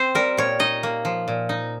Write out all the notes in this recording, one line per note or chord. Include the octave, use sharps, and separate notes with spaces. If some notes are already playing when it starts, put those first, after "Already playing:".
Already playing: C4 C5
G3 A#4
A#2 C#5
D#4 D#5
A#3
F3
A#2
D#4